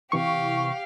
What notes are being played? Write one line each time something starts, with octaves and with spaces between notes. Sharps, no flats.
C3 E3 G4 F5 C#6